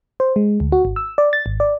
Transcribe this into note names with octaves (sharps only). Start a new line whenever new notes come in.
C5
G#3
D2
F#4
G#1
E6
D5
A6
G#1
D5